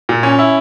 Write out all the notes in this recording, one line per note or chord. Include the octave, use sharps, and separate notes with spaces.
A#2
C#4
E4